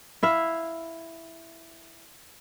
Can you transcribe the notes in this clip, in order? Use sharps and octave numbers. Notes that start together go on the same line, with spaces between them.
E4 E5 F5